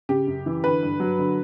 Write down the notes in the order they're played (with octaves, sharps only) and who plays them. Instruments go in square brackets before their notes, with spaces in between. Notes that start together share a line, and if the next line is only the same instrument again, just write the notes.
[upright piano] C#3 G4
F#2
E3
D3 B4
G2
F#3
D3